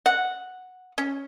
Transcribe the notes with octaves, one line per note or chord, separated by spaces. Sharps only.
F#5
C#4